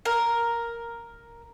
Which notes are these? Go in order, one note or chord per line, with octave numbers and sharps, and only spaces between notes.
A#4